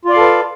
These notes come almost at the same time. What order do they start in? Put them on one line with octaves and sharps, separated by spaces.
F4 D5 F5 A4 B4